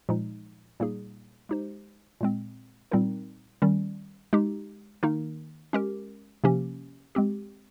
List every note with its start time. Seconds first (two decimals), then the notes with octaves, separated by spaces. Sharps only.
0.09 A#2 F3 G#3 D#4
0.80 A#2 G3 A#3 D#4 G#4
1.49 G#3 D#4 G4 C5
2.21 A#2 G#3 C4
2.92 A#2 G3 C4 D#4 A#4
3.62 D#3 G3 C#4
4.33 G#3 D#4 G4
5.03 D#3 A#3 D#4 A#4
5.73 G#3 C#4 G4 A#4
6.44 C3 F3 A#3 C#4 G4
7.15 G#3 C4 G4